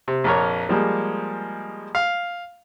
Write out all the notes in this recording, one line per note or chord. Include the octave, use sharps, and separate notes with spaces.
C3
A#1 F2 A#4 C#5
F3 G3 G#3 A#3
F5